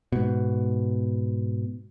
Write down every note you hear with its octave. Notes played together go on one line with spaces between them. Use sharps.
G#2 B2